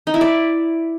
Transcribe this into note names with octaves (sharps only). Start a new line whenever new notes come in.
D#4
E4
D5